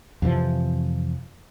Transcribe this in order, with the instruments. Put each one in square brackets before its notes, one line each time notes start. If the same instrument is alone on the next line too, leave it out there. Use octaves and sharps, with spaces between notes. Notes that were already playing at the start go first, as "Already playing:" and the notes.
[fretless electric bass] F2 C3 E3 F3